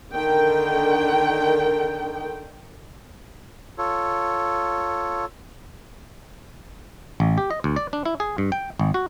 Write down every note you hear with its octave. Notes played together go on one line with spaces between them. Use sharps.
D3 D#3 A#4 G5
F4 A4 C#5
A1
G4
D#5
D2
D5
D4
E4
G#4
G2
G5
G#1
F#4